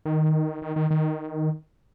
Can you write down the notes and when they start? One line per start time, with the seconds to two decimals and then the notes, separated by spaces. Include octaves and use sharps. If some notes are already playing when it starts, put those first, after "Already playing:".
0.06 D#3
0.62 D#3
0.76 D#3
0.90 D#3